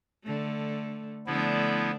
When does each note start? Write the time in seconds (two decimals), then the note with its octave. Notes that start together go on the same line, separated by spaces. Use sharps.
0.24 D3 A3
1.27 D3 F3 A3 B3 D4 E4